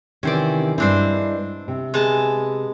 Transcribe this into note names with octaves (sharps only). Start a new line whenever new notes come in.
C3 D#3 E3 C#4 C5 D5
G2 G#3 C4 D4 E4 C5
C3
G#3 B3 A5